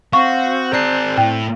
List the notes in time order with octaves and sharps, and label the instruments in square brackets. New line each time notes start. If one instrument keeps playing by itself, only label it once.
[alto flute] C4 [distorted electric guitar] F#4 [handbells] F5 [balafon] C#6
[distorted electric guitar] G#4 A#4 [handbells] D5 F#6 C7
[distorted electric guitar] A2 [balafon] G5